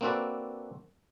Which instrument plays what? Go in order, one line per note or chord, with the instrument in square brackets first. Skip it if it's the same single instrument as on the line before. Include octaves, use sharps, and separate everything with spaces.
[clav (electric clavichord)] A#3 C4 D4 F#4 A4 B4